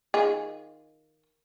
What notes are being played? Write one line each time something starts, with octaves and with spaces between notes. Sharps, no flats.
D#3 F4 G#4